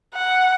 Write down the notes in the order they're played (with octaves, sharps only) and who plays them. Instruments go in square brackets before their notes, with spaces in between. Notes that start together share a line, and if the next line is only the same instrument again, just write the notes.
[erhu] F#5